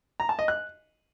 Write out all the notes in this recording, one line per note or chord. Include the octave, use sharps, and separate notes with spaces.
A#5
A5
D#5
F#6